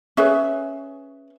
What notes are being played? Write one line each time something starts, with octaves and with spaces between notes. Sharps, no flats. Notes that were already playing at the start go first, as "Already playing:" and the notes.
C#4 G#4 B4 E5